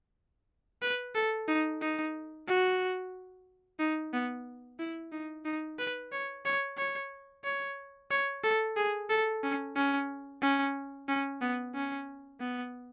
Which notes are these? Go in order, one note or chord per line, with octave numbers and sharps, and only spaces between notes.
B4
A4
D#4
D#4
F#4
D#4
B3
E4
D#4
D#4
B4
C#5
C#5
C#5
C#5
C#5
A4
G#4
A4
C#4
C#4
C#4
C#4
B3
C#4
B3